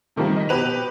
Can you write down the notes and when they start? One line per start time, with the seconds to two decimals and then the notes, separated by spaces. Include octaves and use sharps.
0.16 C3 D#3 F3 G3 A#3
0.36 D#5 B6
0.49 B2 G4 B4 F7